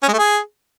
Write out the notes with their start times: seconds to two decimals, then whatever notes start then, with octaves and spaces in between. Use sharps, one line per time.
0.03 C#4
0.08 G#3
0.14 A3
0.19 G#4